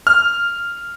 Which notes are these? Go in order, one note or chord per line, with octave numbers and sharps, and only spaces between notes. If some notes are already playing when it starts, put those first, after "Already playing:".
F6